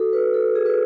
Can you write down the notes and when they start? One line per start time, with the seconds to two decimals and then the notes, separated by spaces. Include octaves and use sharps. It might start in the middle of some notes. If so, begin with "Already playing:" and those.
Already playing: F#4 A4
0.13 B4
0.34 A4
0.55 G#4
0.66 B4